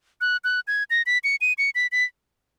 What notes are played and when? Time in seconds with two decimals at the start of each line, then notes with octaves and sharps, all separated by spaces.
0.21 F#6
0.44 F#6
0.68 G#6
0.90 A#6
1.06 B6
1.24 C#7
1.41 D#7
1.58 C#7
1.75 B6
1.92 B6